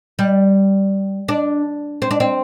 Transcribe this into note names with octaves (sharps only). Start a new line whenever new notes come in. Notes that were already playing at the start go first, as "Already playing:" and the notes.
G3
D4
C4
D4
C4